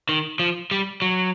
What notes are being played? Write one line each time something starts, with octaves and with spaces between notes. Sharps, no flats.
D#3
F3
G3
F#3